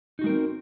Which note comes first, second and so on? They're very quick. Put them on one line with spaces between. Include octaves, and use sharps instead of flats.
D#4 F#4 G#3 A#4 C4